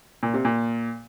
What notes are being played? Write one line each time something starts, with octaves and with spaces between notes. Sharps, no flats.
A#2
C3
A#2